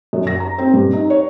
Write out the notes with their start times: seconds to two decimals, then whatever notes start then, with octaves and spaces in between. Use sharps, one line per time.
0.13 F#2
0.27 A#6
0.40 A#5
0.58 C4
0.74 G2
0.93 D#4
1.10 C#5